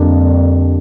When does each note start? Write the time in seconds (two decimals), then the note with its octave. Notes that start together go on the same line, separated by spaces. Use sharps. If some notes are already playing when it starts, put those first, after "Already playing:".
Already playing: F2 D3 G3 A#3 D4 G4